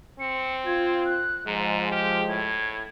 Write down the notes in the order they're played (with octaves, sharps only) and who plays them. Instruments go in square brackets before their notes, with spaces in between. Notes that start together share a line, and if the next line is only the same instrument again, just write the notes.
[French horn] C4 [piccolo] C#7
[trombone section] F4 [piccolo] G#6
[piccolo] F#6
[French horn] G#2 [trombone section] F3 G#3 [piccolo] A#5
[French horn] G4 [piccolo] F6
[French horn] A2 [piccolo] G#6